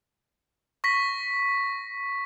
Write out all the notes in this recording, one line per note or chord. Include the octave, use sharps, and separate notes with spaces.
C#6 A#6 B6